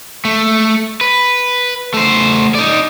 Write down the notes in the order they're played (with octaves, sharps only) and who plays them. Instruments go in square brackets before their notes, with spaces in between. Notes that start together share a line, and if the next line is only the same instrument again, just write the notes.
[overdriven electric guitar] A3
B4
A3 C5
D#4 D5